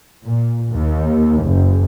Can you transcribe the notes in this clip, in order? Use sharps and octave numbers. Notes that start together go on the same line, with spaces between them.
A#2
D#2
F#1